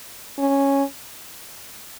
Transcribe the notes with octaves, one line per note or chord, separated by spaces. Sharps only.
C#4